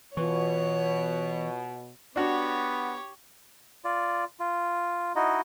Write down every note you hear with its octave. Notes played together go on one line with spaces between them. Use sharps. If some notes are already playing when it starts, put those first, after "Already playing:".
B2 E3 F4 B4 C#5 C#6
B3 D4 F#4 G4 C#5
F4 D5
F4
D#4 E4 F#4 D#5